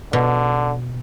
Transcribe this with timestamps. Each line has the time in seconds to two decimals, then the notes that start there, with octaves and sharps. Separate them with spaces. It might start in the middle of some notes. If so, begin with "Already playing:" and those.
0.13 B2 D3